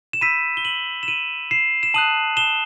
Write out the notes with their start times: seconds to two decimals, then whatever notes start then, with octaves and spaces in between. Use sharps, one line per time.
0.13 E7
0.21 B5 E6 G6 B6 D#7
0.57 G7
0.65 D#7 F#7
1.03 E7
1.08 D#7 F#7
1.51 C7 E7
1.83 E7
1.94 A5 D#6 F#6 D#7 F#7
2.37 E7 G7